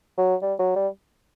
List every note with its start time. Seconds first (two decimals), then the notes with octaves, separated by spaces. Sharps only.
0.18 F#3
0.42 G3
0.59 F#3
0.76 G3